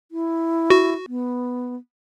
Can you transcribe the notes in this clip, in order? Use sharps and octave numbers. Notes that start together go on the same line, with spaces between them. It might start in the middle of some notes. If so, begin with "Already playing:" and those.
E4
F#4
B3